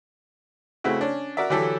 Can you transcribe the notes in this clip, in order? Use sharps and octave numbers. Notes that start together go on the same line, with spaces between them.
C#3 A3 C4 E4 F#4
C#4 D4
F#4 A#4 D5 E5
D3 E3 F#3 E4 G4 A4